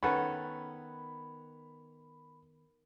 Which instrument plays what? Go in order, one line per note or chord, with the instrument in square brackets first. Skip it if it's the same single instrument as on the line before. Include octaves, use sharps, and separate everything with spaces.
[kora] D#3 B3 A4 [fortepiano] C#4 B4 F#5 [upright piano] B5